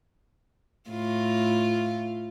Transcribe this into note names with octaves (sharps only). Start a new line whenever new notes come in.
A2 F4